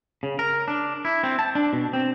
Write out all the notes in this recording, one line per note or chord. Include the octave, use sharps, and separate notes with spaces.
C#3
A#4
D4
E4
C4
A5
D4
B2
C4